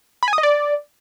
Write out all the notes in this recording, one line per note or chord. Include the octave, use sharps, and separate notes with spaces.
B5
G#5
D#6
D#5
D5